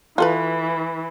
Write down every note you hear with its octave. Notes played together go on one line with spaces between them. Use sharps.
E3 F4 A4 B4